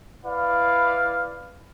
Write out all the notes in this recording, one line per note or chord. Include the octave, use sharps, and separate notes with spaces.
E4 B4 D5 F5